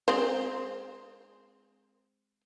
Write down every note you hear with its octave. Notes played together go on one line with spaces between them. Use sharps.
G#3 C4 C5